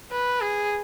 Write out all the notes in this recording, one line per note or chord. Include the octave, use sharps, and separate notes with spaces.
B4
G#4